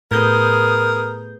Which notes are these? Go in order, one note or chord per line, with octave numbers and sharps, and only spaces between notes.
A2 B3 G#4 A#4 G6